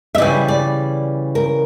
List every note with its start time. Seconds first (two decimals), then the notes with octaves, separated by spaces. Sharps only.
0.15 E5
0.18 C#3 E3 G3 D5
0.48 D5
1.35 A#4